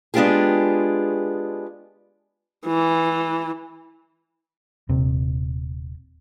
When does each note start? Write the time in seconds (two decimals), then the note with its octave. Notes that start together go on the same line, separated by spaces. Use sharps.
0.14 G#3 B3 D4 F4 G4 G#4
2.66 E3
4.89 D#1 C3